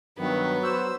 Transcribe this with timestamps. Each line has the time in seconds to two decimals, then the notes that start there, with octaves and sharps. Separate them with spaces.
0.18 G2 D#3 F#3 B3
0.63 C5 E6